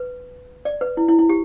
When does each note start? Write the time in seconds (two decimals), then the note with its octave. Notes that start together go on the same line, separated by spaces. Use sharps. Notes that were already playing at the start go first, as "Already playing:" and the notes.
Already playing: B4
0.65 D5
0.81 B4
0.97 E4
1.08 E4
1.19 E4
1.29 G4